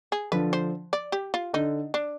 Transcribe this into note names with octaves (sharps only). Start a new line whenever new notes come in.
G#4
D3 F3 B4
C5
D5
G4
F4
D3 D#4
D4